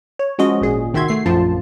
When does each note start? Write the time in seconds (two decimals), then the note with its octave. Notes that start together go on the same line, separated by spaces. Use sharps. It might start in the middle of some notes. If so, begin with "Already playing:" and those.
0.19 C#5
0.39 F3 G#3 C#4 F#4 D#5
0.61 G#1 A#2 G#4
0.93 C2 D#3 F#4 E5 C6 G#6
1.08 A3 C7
1.26 A#1 F#2 F3 F4 A5